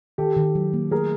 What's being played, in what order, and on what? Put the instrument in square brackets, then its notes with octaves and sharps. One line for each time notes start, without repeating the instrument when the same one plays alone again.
[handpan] D#3 [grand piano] G4 A4
[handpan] D#3
F#3
A#3
[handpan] A3 [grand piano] G#4 A#4